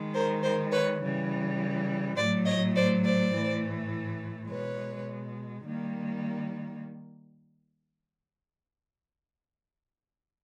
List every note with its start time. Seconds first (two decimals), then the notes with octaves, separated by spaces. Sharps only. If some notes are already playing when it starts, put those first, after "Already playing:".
Already playing: D#3 G#3
0.14 A#4 C5
0.42 A#4 C5
0.71 B4 C#5
1.01 C#3 E3 G3
2.16 A2 F#3 A3 C5 D5
2.45 C#5 D#5
2.75 C5 D5
3.04 C5 D5
3.32 A2 E3 A3
4.48 B2 G#3 B4 C#5
5.64 D#3 G3 A#3